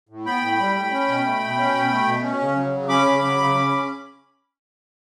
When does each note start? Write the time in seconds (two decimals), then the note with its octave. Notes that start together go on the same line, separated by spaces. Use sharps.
0.09 A2
0.25 B3 G5 B5
0.42 A2
0.59 G3
0.75 A2
0.92 C#4
1.07 B2
1.25 A3
1.41 B2
1.57 C#4
1.74 B2
1.90 A3
2.07 B2
2.22 C#4
2.40 C#3
2.55 F#3
2.73 C#3
2.89 C#4 B5 D6
3.05 C#3
3.22 F#3
3.38 C#3
3.55 C#4